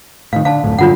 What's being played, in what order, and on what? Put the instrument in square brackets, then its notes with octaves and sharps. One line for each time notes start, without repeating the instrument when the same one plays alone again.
[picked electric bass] A2 D#3 [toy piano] F5
[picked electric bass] D3 [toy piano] F5 A5
[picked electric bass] D1 F#2 A2
[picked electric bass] G2 D3 F#3 [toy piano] D4 F4 F#5